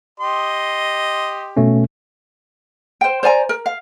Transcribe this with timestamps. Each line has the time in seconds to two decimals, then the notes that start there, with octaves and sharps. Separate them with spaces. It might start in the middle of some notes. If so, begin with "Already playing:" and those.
0.20 G4 D#5 C6
1.57 B2 A3 C#4
3.01 C5 G5
3.23 C5 D5 G#5 A#5
3.49 A#4
3.66 F5